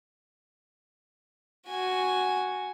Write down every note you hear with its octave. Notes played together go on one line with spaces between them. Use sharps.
F#4 G#5